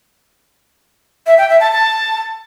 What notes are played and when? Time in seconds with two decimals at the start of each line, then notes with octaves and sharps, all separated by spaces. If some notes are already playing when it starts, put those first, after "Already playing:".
1.27 E5
1.38 G5
1.49 E5
1.61 A5
1.72 A5